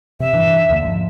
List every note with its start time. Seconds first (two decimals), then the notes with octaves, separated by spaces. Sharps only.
0.20 C3 E5
0.33 G2 E3 D4
0.69 D#2 D3 A#3
0.85 G#1 G#2 F3